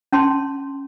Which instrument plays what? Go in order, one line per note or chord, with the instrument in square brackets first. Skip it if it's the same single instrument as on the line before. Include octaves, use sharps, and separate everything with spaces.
[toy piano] C#4 A5 C6